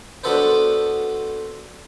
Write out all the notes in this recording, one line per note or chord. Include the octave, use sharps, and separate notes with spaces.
B3 D4 F#4 A4 B4 C5